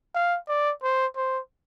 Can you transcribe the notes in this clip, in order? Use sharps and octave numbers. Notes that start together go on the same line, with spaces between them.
F5
D5
C5
C5